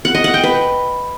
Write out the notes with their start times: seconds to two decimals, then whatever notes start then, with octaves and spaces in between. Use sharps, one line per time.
0.05 F#5
0.15 D#5
0.24 F#5
0.34 G5
0.43 B4